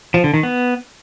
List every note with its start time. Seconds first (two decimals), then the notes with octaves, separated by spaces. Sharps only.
0.14 F3
0.24 D3
0.34 D#3
0.43 B3